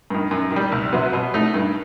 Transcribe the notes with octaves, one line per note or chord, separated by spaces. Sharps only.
G2 D#3
F#2
D#3 G3
C2
C3 F#3 B3
B2
A3 D#4
G2